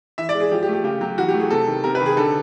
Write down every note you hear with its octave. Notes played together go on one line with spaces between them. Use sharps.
E3 E5
D5
G#3
G#4
F3 G4
G4
A3
G4
C#3 G4
F#3 G4
E3 F#4
G4
A3
G#4
C3 A4
D#3
C3 A#4
B4
D#3
G#4
D3 A4